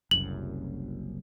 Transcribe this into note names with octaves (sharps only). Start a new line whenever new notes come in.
F#1 C2 F#2 F#7